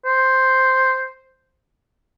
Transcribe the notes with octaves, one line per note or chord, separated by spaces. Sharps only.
C5